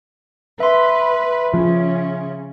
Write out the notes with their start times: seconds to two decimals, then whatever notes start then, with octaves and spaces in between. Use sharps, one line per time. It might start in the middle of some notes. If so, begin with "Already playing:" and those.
0.60 B4 E5 C6
1.54 C#3 F3 C#4